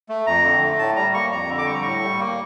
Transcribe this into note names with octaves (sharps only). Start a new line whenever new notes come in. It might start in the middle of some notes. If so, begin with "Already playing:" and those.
A3
F2 A#5
D3
A3
A2 A5
G3 A#5
A#3 C#6
F2 A#5
D3
D6
G3 C#6
A#5
A2 C#6
G3
A#3